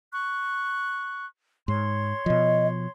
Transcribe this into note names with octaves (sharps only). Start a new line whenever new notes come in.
C#6 F#6
G#2 C#5 C6
B2 F3 D#5